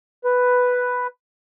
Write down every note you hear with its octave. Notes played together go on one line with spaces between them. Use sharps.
B4